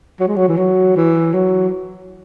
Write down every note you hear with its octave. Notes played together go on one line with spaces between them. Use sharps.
F#3
G#3
F#3
E3
F#3
E3
F#3